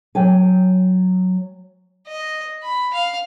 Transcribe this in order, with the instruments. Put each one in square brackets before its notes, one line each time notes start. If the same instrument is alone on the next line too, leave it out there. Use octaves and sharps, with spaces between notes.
[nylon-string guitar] F#3 G5 G#5
[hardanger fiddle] D#5
B5
F5